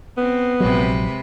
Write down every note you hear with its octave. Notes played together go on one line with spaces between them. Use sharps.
B3 C4
A#1 C3 F#3 G#3 B4